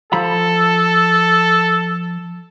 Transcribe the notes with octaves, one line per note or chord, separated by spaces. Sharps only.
F3 A4 A#5 B5